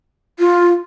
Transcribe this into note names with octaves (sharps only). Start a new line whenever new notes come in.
F4